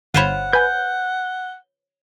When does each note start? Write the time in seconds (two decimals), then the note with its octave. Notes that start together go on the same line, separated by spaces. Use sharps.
0.14 G1 F4 C5 C#5 F#5 B5
0.53 B4 G#5 G6